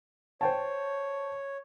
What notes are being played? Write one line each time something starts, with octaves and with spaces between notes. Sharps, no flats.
C5 C#5 G5 A5